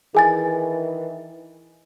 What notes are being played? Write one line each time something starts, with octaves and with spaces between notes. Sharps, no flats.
D#3 E3 G#4 G#5 A6